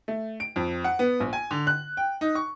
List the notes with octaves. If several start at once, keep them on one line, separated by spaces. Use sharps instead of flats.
A3
D7
F2
F#5
B3
A#1
G#5
D3
F#6
G5
D#4
C#6